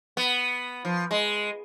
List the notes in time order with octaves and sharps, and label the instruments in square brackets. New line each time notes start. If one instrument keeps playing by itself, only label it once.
[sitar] B3
F3
G#3